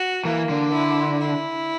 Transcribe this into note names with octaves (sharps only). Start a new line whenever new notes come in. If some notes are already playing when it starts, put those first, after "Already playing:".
Already playing: F#4
E3 A#3
D3
E4
E4